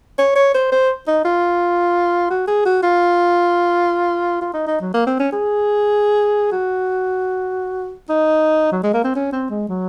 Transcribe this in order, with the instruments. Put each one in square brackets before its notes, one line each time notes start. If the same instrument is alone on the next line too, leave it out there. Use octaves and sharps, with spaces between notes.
[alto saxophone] C#5
C#5
C5
C5
D#4
F4
F#4
G#4
F#4
F4
F4
D#4
D#4
F#3
A#3
C4
C#4
G#4
F#4
D#4
F#3
G#3
A#3
C4
C#4
C4
G#3
F#3